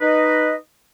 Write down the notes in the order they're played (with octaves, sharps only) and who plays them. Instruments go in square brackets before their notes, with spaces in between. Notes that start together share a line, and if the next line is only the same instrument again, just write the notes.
[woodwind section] D#4 B4 D#5